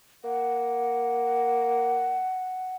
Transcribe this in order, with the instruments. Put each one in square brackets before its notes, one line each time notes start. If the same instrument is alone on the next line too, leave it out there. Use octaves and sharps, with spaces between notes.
[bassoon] A#3 [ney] F#5